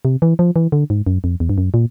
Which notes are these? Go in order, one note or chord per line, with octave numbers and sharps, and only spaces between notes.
C3
E3
F3
E3
D3
G#2
F#2
F2
E2
G2
F#2
A#2